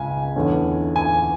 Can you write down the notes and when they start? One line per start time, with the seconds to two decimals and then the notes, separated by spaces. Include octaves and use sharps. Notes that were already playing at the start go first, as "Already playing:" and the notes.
Already playing: C#2 C#3 G#5
0.36 E2 D3 A3 C#4
0.96 G#5